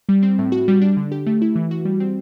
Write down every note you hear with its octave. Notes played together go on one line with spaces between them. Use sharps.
G3
C4
A2
F#4
G3
D4
D3
G4
A3
E4
E3
F#4
G3
C4